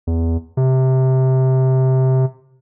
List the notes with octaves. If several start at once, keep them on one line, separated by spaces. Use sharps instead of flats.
E2
C3